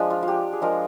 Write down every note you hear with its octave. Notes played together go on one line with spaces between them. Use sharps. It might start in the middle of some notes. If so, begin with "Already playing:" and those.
Already playing: F3 G#3 D4
F4
F4
G4
G#4
F3 G#3 D4 F4 A#4